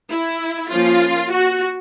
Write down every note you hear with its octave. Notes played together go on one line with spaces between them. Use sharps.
E4
F3 A#3 C#4 F4
F#4